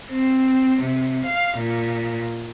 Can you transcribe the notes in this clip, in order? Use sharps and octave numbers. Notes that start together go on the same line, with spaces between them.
C4
C3
F5
A#2